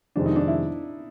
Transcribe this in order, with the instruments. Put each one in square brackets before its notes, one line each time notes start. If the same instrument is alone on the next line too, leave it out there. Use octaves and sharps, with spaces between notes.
[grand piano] F2 C3 D#3 G#3 C4 [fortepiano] D4
[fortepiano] D#4
D4
E4